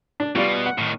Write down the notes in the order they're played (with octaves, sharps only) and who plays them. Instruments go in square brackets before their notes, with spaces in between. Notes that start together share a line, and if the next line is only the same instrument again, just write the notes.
[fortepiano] D4
[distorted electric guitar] B2 [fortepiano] G3 F4 D5
[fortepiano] F#5
[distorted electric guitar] A2 D#3